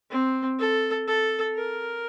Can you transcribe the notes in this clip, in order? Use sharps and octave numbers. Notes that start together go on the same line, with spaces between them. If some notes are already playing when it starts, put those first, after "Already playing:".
C4
A4
A4
A#4